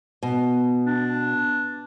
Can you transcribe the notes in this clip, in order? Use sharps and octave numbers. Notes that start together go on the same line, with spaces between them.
B2
D4